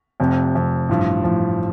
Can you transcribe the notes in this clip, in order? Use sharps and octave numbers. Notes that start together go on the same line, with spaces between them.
F1 F2 C3
F1 F2 C3
A1 G2 F3
A1 G2 F3